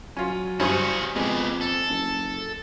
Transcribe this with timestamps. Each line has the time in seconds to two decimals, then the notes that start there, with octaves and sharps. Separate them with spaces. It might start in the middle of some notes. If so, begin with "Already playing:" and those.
0.17 F#3 C#4 F4
0.60 G2 C#4 F#4 G#4 C5
1.16 F2 B2 G#3 G4
1.61 A4
1.89 F#1